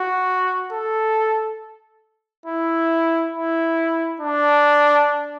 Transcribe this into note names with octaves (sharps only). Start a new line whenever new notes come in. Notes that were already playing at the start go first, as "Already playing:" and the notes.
Already playing: F#4
A4
E4
E4
D4